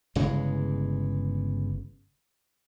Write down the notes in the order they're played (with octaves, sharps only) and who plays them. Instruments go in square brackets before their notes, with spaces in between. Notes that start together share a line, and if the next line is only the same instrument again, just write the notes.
[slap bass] G1 C#3 E3 G#3